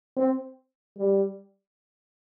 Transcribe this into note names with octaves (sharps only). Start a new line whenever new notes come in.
C4
G3